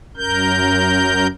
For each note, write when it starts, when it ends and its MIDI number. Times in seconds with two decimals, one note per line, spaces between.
0.17 1.27 42
0.17 1.27 70
0.17 1.27 91